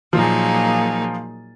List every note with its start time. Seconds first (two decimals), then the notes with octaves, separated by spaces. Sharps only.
0.13 A#2 F3 F#3 A#3 D#4 F4 G#4